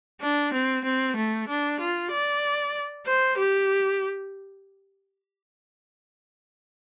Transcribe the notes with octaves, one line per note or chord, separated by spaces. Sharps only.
D4
C4
C4
A3
D4
F4
D5
C5
G4